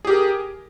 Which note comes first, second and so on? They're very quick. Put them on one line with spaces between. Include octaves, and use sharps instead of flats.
G#4 G4 A#4